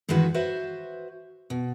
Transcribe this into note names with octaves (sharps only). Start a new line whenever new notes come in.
G2 D#3 E3 G#3 F#4 B4
F#4 B4 C5 E5
B2